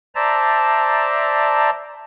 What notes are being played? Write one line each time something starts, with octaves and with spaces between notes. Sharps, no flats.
C5 D5 E5 A5 A#5